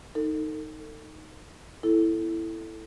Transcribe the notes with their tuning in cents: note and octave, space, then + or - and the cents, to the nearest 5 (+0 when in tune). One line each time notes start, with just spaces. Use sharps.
D#4 +0 A4 +35
B3 +0 E4 +5 A4 +0